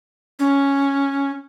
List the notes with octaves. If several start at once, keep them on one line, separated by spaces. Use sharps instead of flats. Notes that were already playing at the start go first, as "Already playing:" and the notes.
C#4